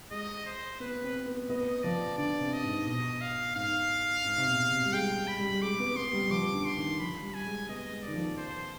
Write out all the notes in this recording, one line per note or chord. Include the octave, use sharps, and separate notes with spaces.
G#3 D#5
C5
B3 B4
C4
B3
B3 D#5
F3 D5
D3 D5
C3
D#5
G#2
B2 D#5
F5
G#2 F5
G#2
C3
B2
C3
G3
G#3 G5
B5
G3
G#3 D6
B3
B3 C6
G3
F3 D6
D3
C6
D#3
F3 B5
G3
G#5
G#3
B3 D#5
G#3
D#3 D5
F3
C5